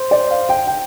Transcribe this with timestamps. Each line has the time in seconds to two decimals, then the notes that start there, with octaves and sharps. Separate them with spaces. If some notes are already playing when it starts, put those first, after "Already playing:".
Already playing: C5
0.11 D5
0.30 F5
0.49 G5
0.67 G5